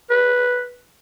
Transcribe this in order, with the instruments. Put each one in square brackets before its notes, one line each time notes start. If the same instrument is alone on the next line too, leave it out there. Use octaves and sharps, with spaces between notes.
[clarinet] B4